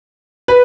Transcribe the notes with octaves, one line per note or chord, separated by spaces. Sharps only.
B4